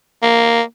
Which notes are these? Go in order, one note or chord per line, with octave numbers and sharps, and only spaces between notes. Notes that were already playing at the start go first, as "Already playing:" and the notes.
A#3